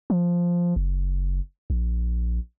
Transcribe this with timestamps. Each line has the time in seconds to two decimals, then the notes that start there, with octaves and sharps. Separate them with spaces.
0.10 F3
0.76 F#1
1.70 A#1